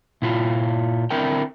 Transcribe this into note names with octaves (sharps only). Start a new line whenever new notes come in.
A#2 E4 F4
D3 C4 E4 A#4 G5